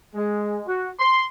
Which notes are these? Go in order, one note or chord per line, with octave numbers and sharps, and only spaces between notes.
G#3
F#4
C6